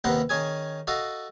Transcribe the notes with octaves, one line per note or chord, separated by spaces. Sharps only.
D#2 C3 B3 A#4 F#5 C6
D#3 C#4 G#4 G#5
F#4 A4 D#5 F5